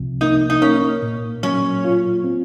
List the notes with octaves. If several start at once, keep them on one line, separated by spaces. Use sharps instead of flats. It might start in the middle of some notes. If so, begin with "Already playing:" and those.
Already playing: C2 C3 F3
A#3 D#4
D#4
A#3 C#4
A#2
F#3 C#4
F4
C4